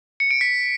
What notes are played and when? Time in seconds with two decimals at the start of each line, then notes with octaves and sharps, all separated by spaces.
0.20 C#7
0.31 D7
0.41 B6